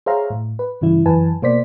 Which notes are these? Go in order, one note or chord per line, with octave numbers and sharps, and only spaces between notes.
G#4 C5 C#5 E5 F5 A#5
A2
B4
G2 C#3 E3 E4
F#2 E3 B4 G#5 A5
B2 A#3 C5 D5 B6